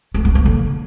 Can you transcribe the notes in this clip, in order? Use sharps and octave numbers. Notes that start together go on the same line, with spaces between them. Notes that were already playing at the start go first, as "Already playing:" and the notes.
A3
B3
A#3
D3